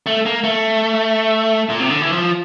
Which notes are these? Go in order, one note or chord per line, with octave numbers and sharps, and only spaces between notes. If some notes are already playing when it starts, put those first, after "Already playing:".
A3
A#3
A3
A#2
C3
D3
E3
F3